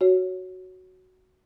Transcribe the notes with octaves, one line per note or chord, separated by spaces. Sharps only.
F#4 C#5